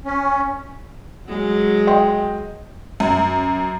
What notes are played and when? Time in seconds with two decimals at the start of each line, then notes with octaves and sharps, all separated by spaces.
0.05 C#4
1.27 F#3 G#3
1.87 D#5 G5 C6
3.00 F#2